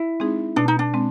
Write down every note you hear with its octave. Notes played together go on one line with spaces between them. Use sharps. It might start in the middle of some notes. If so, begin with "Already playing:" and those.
Already playing: E4
G#3 C4 D#4 G#4
B2 D4
D#4
D4
G#3 C4